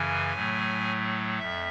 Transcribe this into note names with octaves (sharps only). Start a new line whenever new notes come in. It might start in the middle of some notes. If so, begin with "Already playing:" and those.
Already playing: F#2 C#3 E3 G#5
A2 F#3 A3
F2 E5